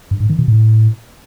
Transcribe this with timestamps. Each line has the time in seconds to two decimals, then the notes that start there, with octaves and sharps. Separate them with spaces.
0.11 G2
0.20 G#2
0.29 D#3
0.39 B2
0.48 A2